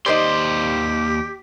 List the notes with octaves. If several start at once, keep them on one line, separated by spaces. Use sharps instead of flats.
D#2 D#4 G4 C5 D5 C6